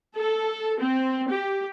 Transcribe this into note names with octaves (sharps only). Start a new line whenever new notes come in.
A4
C4
G4